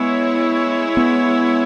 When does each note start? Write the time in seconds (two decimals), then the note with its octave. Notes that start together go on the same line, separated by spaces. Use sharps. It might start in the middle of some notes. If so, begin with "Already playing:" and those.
Already playing: G#3 B3 E4 C#5
0.97 B3